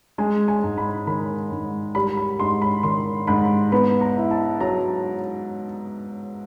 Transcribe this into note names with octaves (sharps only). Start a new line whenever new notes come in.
G#3 G#5
G#5
G#2
B5
D#3 B5
G#2
G3 B5
B5
G#2 C6
B5
D#3 C6
G#2 B5
B3 B5
A#5
E4
A5
F#3 A#5